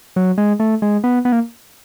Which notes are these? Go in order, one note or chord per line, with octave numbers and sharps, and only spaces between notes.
F#3
G#3
A3
G#3
B3
B3
A#3